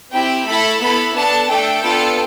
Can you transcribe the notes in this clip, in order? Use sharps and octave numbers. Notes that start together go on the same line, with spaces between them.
C4 E4 G4 G5
A3 E4 A4 B5
B3 E4 A4 B5
B3 D4 A4 A5
A3 D4 A4 G5
B3 D4 F4 A4